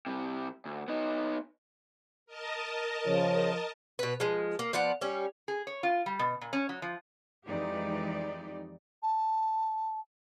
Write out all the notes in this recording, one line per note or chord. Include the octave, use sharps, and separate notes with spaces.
C3 G3
D2
B3 D#4
A#4 D#5 A5
C#3 F3 C#5
B2 B4
F3 G#3
A#3
F3 B3 D5 F#5
G3 C#4
G#4
C#5
F4
G3
B2
A#2
C#4
F#3
F3
F2 E3 G#3 D#4 G4 D5
A5